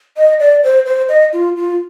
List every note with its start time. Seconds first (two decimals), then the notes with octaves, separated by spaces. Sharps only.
0.17 D#5
0.40 D5
0.63 C5
0.86 C5
1.09 D#5
1.33 F4
1.56 F4